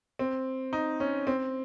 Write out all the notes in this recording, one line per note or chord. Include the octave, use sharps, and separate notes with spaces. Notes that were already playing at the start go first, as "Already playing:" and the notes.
C4
D#4
C#4
C4